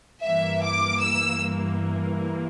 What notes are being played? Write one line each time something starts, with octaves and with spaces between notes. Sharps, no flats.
G2 E3 A#3 E5
D6
E6